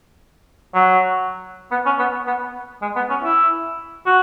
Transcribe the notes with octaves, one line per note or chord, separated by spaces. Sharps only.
F#3
B3
C#4
B3
B3
G#3
B3
C#4
E4
F#4